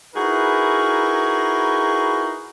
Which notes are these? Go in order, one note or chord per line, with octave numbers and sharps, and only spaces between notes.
D#4 E4 F#4 G#4 A#4 B4